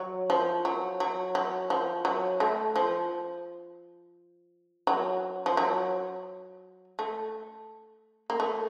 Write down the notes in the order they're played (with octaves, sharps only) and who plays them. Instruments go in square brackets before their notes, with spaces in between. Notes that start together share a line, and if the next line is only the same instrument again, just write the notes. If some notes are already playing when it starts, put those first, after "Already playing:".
Already playing: [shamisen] F#3
F3
F#3
F#3
F#3
F3
F#3
A3
F3
F#3
F3
F#3
A3
A#3
A3